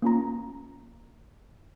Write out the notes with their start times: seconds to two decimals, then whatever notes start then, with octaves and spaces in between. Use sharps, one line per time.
0.02 A#3 C#4 F4 A#5